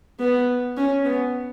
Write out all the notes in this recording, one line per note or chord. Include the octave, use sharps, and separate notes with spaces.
B3
C#4
B3